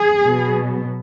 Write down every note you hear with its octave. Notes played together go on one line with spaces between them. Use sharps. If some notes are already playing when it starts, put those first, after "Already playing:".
Already playing: G#4
B2 F#3 B3